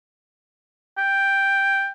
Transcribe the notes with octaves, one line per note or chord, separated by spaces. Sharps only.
G5